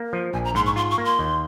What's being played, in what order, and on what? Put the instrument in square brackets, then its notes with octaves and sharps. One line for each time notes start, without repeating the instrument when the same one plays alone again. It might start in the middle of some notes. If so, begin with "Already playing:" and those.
Already playing: [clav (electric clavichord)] A#3
F3
[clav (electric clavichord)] A#1 [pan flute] G#5
[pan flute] A#5
[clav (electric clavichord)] G#2 [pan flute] C6
[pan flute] C#6
[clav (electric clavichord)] F4 [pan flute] C6
[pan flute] C#6
[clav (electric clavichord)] A#3
[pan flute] C6
[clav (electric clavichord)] D#2